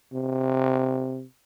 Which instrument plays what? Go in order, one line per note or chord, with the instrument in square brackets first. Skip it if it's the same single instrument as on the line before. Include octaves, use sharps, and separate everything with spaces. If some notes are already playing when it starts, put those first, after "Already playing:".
[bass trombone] C3